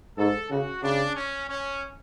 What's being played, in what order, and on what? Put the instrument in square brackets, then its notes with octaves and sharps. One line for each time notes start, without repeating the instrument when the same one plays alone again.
[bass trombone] G#2 [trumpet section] A4
[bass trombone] C#3 [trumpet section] F#4
[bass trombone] C#3 [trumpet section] D4
[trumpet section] C#4
C#4